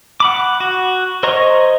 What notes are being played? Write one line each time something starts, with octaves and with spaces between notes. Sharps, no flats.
F#5 B5 D6
F#4
C5 C#5 D#5 A#5 C#6